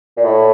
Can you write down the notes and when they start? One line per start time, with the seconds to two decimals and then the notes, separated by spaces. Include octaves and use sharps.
0.17 A#2
0.24 A2